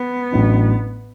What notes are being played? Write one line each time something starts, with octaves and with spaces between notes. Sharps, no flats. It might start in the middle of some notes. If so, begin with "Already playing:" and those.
Already playing: B3
A1 A2 F#3 D4